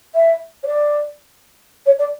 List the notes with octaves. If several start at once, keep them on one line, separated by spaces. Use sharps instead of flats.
E5
C#5
D5
C#5
D5